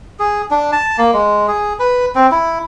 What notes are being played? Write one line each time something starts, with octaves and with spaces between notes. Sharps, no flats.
G#4
D4
A5
A#3
G#3
G#4
B4
C4
E4